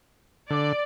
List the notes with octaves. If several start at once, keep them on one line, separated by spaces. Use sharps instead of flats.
D3 D5